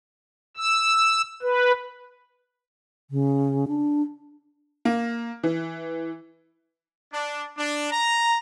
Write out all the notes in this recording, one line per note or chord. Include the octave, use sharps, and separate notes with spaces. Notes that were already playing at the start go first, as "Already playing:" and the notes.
E6
B4
C#3
D4
A#3
E3
D4
D4
A#5